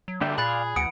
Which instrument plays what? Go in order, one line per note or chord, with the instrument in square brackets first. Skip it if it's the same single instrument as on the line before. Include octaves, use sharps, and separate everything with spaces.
[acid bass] F#3
[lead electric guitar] G2 A#3 [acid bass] D3 [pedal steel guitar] D4 E5 G5
[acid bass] A#2 [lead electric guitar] G#4 [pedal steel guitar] D5 F5 [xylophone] B5 F#6 A6
[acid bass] D2 [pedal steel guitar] E3 F#5 D#6 [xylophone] C#7 D7